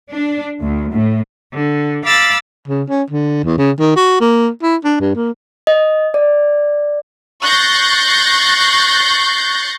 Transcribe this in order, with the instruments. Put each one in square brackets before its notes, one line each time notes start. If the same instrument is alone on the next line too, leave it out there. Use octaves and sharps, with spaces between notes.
[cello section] D4
D2
A2
[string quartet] D3
F5 B5 D6 E6 A6
[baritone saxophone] C#3
C#4
D3
E2
C#3
D#3
F#4
A#3
E4
D4
G2
A#3
[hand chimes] D#5
D5
[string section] C#6 F#6 G6 A6 A#6 C7